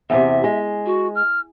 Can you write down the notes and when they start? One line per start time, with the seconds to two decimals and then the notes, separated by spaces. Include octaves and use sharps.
0.10 E2 A2 C3 E5
0.44 G#3
0.86 F#4
1.15 F6